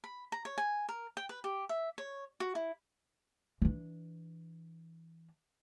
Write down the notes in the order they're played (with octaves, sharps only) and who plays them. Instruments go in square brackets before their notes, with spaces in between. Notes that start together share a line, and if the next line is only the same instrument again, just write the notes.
[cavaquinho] B5
A#5
C#5
G#5
A#4
G5
B4
G4
E5
C#5
F#4
E4
[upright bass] E3 D4